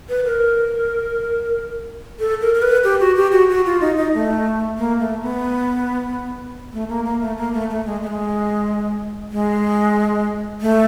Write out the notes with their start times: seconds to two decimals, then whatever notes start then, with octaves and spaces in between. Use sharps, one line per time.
0.09 B4
0.25 A#4
2.19 A4
2.41 A#4
2.54 A#4
2.62 B4
2.84 G4
3.00 F#4
3.16 G4
3.32 F#4
3.50 F#4
3.66 F4
3.81 D#4
3.97 D#4
4.14 A3
4.78 A#3
5.00 A3
5.22 B3
6.73 A3
6.89 A#3
7.05 A#3
7.21 A3
7.38 A#3
7.53 A3
7.70 A3
7.86 G#3
8.02 A3
8.07 G#3
9.32 G#3
10.61 A3